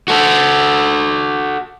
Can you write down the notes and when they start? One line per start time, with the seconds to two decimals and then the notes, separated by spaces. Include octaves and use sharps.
0.08 F#4 A4